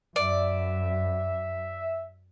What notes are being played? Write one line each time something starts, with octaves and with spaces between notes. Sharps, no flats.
F#2 D5 E5